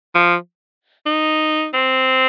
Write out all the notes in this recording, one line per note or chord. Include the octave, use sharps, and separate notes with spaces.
F3
D#4
C4